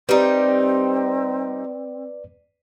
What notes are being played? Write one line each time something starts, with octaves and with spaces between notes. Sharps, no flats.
G3 C4 D#4 B4 D5